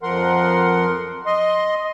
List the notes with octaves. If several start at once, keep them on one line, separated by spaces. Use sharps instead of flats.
F2 F3 A#4 F#5 C6
D#5 C6